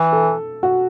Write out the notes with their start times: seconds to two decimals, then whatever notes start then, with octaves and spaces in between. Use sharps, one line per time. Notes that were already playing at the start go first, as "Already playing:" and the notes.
Already playing: E3
0.13 A4
0.63 F#4